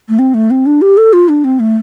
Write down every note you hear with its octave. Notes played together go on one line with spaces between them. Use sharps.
A3
C4
A3
C4
D4
G4
A4
F4
D4
C4
A3